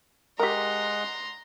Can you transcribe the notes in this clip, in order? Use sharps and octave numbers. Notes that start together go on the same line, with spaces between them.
G#3 G4 A#4 D#5 F#5 A#5 C6